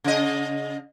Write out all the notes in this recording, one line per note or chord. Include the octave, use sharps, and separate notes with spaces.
C#3 D#5